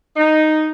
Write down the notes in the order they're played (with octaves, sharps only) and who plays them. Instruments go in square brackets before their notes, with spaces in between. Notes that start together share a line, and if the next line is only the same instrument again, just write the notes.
[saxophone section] D#4